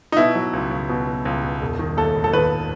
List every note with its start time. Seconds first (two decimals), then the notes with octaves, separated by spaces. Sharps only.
0.12 D#4
0.17 B2 E4
0.35 F#3
0.53 C#2
0.71 C#2
0.89 B2
1.07 B2
1.25 C#2
1.43 B2
1.61 E1
1.79 D#3
1.97 D#2 A4
2.16 E1
2.24 A4
2.33 D#3 B4